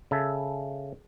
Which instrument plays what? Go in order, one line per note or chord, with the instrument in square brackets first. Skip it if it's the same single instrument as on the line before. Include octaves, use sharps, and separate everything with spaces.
[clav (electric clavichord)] C#3 A4 E5